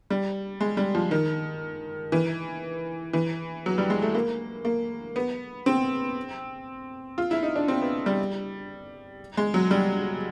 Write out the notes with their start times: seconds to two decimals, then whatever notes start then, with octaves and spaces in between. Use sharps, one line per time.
0.10 G3
0.61 G#3
0.77 G3
0.95 F3
1.11 D#3
2.12 E3
3.13 E3
3.66 F#3
3.78 G3
3.90 G#3
4.02 A3
4.15 A#3
4.65 A#3
5.16 B3
5.66 C4
7.18 F4
7.31 E4
7.43 D#4
7.56 D4
7.68 C4
7.81 B3
8.06 G3
9.37 G#3
9.54 F#3
9.71 G3